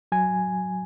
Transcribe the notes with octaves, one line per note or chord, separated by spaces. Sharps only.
F#3 G#5